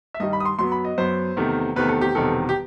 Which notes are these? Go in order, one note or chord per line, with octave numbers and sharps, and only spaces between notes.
E5
G2 D#3 G3 D#5
B5
D#6
C6
F#2 F#3 B3 C6
B5
D#5
F#2 F#3 B3 C5
E2 C3 D#3 A3
E2 C3 D#3 A3 B4
A4
G4
E1 E2 C3 D#3 G3 A4
G4